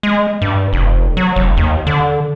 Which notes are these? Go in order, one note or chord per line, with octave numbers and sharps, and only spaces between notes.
G#3
G2
F1
F#3
F1
D#2
D3